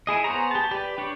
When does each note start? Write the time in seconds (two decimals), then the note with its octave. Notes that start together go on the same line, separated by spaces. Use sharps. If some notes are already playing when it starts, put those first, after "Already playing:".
0.07 E4 G#4 D#5
0.24 B3 G#4 C5 C#5 A#5
0.51 G4 A5
0.71 G4 B4 D5
0.98 D4 G4 C#5